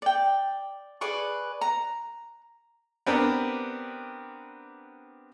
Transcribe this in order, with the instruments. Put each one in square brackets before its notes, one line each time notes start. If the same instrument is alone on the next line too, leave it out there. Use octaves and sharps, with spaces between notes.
[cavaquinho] D5 G5
G#4 B4 D5 C#6
A#5
[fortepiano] B3 C4 D4 G4 A#4